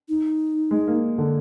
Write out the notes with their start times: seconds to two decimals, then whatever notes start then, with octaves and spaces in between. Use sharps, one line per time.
0.09 D#4
0.71 G#3
0.87 A#3
1.18 D3